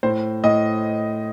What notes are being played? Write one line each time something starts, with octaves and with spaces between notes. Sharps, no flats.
A2 C5
A2 D#5